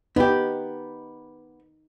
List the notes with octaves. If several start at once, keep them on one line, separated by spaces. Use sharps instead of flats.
B3 D#4 G4